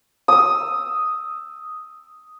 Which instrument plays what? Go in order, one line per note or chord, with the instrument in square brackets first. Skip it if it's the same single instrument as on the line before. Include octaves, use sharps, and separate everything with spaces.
[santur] D#6 E6